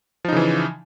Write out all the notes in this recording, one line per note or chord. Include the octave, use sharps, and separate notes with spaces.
C#3 E3 F3 D#4